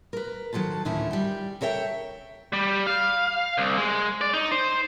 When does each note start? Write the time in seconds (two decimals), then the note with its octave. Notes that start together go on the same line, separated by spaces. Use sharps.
0.13 A#4 B4
0.53 D#3 F#3 A4 C5 A5
0.85 D2 A2 D#3 A3 C#4 E4
1.11 G3 G5
1.61 A4 A#4 C#5 E5 G5
2.53 G3
2.87 F5
3.58 C2
3.77 G#3
4.21 D5
4.34 D#4
4.52 C5